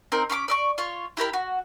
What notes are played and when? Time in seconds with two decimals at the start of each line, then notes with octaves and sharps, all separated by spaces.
0.12 C4 D#4 A#4
0.30 C#4 B5 C6 D6
0.48 D5 E5 C#6
0.78 F4 C#5
1.17 E4 G4 A#4 B5
1.33 F#4